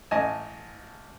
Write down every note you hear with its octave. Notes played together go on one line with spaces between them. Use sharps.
A1 D#5 G#5 A5